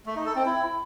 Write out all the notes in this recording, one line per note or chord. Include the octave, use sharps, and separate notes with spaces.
A3
D#4
A4
C4
E4